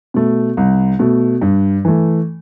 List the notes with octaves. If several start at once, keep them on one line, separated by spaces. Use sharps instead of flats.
B2 A3
C2
B2 A3
G2
E3 A3